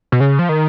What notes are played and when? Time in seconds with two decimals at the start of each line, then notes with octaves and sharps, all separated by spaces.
0.12 B2
0.20 C#3
0.39 F3
0.49 D#3